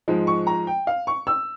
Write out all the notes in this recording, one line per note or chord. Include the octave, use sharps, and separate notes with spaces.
G#2 F3 G#3
C#6
A#5
G5
F5
C#6
E6